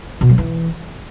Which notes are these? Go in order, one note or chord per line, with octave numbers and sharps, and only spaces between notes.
B2
F#3
E3